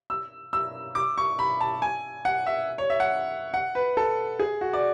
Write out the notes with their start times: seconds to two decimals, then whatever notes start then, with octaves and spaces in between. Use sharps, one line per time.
0.10 E6
0.53 E6
0.95 D6
1.18 C#6
1.39 B5
1.60 A5
1.82 G#5
2.25 F#5
2.46 E5
2.78 C#5
2.90 E5
3.00 F#5
3.54 F#5
3.75 B4
3.97 A4
4.39 G#4
4.61 F#4
4.73 D5